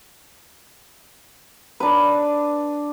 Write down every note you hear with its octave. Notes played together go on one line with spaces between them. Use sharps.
D4 B4